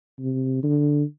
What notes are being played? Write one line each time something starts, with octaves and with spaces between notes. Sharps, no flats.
C3
D3